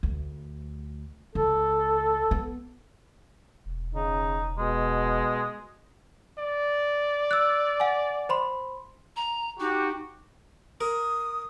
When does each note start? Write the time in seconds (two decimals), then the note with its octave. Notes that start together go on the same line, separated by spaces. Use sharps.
0.03 D2
1.35 C#2 A4
2.31 B3
3.66 E1
3.95 C#3 D#4
4.58 B2 G#3
6.39 D5
7.31 E6 F#6
7.80 F#5 G#5
8.29 C5 B5 C6
9.16 A#5
9.60 D#4 F#4 G4
10.81 A#4 D#6